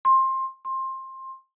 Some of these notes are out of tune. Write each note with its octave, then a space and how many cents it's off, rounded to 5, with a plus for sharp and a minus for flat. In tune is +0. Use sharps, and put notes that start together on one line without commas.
C6 +20
C6 +20